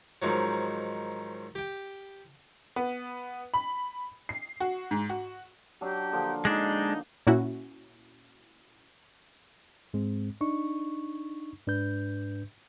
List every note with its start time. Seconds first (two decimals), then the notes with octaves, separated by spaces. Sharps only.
0.22 G#2 D#3 F3 F#3
1.55 G4 G5
2.76 B3
3.54 B5
4.29 C7
4.60 F#4
4.91 G#2
5.09 F#4
5.81 F#3 D4 G4
6.12 D3 F3 A#3
6.45 G#3 D4 D#4
7.27 A#2 A#3 C#4 E4 F#4
9.94 G#2 G#3 C4
10.41 D4 D#4 C#6
11.67 G#2 D4 B4 G6